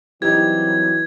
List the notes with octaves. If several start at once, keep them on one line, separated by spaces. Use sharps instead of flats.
E3 F#3 G3 C4 D#4 E4 G4 G#6